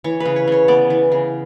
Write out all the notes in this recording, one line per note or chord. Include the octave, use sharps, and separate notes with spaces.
E3 C#5
B4
C#3
C#5
C#3 C#5
B3 D5
E3
C#3